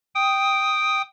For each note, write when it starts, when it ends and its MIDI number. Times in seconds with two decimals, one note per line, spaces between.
0.15 1.02 79
0.15 1.02 87